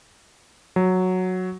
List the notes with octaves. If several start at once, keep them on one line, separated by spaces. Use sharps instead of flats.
F#3